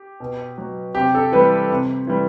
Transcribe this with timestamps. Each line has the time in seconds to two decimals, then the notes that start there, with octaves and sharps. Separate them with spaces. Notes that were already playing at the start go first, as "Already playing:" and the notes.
Already playing: G4
0.20 B2
0.58 F#3
0.95 C3 G4
1.15 A4
1.32 E3 G3 B4
1.70 C3
2.07 E3 G3